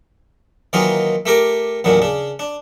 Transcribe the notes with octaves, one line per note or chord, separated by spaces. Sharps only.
D#3 E3 F#3 A#3 D#4 F4
A3 G4 A#4 D6
A1 D#2 A#2 F#3 D4
C#3 D4
D4